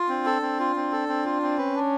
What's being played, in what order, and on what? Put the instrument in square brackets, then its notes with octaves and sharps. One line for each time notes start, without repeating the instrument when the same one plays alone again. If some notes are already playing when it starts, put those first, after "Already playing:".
Already playing: [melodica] F4
[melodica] C4 [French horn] D4
[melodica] A4
C4
F4
C4
A4
C4
F4
C4
[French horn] C#4 [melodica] B4
[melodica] D4